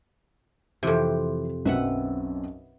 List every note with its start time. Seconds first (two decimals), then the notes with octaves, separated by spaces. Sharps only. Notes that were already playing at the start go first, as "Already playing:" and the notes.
0.83 F2 C3 E3
1.65 B1 F#2 C4 B4 E5 F#5